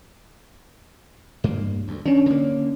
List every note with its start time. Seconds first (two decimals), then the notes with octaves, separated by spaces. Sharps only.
1.44 G2 A#3
1.88 D2
2.06 D#3 C#4 D4
2.26 D3 A#3